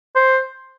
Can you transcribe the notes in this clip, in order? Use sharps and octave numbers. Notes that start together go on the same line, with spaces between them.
C5